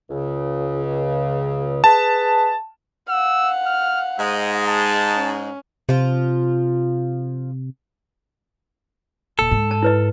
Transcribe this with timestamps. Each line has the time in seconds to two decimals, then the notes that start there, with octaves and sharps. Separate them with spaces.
0.10 C#2 C#3
1.84 G#4 B4 A5
3.09 F5 F#5 E6
3.66 F6
4.19 G#2 G#3 D#5
4.68 A5
5.14 C#4
5.89 C3 F3 F4
9.39 D#1 A4
9.51 G#2
9.71 A5
9.83 E4 B4 D#5